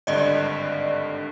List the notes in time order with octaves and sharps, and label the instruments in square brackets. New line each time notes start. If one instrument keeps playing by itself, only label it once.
[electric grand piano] G#1 G2 D3 [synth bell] D5 D#5